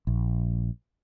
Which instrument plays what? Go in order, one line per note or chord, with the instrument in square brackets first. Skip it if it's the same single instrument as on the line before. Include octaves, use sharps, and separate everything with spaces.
[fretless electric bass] A#1